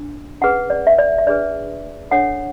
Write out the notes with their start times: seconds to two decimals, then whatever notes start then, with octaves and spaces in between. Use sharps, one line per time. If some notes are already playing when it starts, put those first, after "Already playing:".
Already playing: D4
0.41 C#4 G#4 B4 F#5
0.70 D5
0.87 E5
0.99 D5
1.18 E5
1.27 D4 G#4 B4 D5
2.11 D4 A4 C#5 F#5